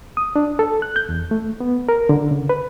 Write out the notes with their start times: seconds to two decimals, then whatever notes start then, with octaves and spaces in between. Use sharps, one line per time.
0.17 D#6
0.36 D4
0.59 A4
0.82 F#6
0.96 G6
1.09 E2
1.31 A3
1.60 B3
1.89 A#4
2.09 D3
2.31 C#3
2.49 B4